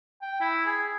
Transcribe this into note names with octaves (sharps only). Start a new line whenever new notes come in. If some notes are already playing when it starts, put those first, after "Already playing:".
G5
E4
G#4